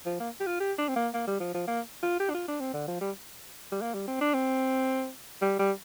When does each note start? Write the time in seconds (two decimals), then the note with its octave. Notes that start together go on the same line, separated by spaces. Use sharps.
0.06 F3
0.20 A#3
0.40 G4
0.46 F4
0.60 G4
0.78 D4
0.88 C4
0.96 A#3
1.14 A#3
1.27 G3
1.40 F3
1.54 F3
1.68 A#3
2.03 F4
2.20 G4
2.30 D4
2.34 F4
2.48 D4
2.60 C4
2.74 D3
2.88 F3
3.01 G3
3.72 G3
3.81 A#3
3.94 G3
4.08 C4
4.21 D4
4.34 C4
5.41 G3
5.59 G3